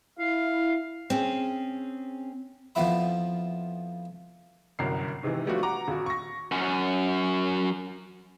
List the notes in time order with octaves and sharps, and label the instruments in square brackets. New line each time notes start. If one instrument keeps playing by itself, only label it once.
[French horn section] E4 [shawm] F5
[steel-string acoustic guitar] C4 C#4 G#4
[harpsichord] F2 F3 B3 E4 E5 B5
[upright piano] G1 C2 F#2 A#4 C7
G#2 C3 D#3 E3
F3 G3 A3 B3 D4 F#4
F#5 A#5 D6
D#1 F#4
C#6 A#6
[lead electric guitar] F#2 C#4